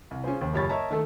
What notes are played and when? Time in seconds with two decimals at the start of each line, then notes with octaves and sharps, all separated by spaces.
0.11 C2
0.24 C#4 F4 G#4 C5
0.41 D#2
0.53 F#1 C#2 G4 C#5 B5 A6
0.69 A#4 C#5 D#5 E5 A5 A#5
0.91 D#3 A3 A4